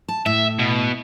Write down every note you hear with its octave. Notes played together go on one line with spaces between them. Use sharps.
A5
A2 E5
B2